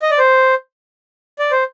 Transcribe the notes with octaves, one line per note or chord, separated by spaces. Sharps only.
D#5
D5
C5
D5
C5